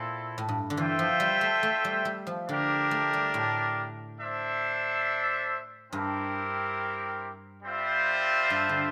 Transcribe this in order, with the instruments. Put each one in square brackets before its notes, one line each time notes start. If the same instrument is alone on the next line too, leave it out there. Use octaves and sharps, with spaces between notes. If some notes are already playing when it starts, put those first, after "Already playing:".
Already playing: [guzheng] A#2 [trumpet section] C4 E4 A4
[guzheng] A2
G2
D3
[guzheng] E3 [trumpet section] F4 C5 E5 G5
[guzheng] F3
G3
A3
A3
G3
G3
F3
[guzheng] D3 [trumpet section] D4 G4 A#4
[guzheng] A3
G3
A2
[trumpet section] D4 A4 C5 E5
[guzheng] G2 [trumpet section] C4 E4 G4 A#4
[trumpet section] G3 C4 F4 C5 E5
[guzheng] G2
D3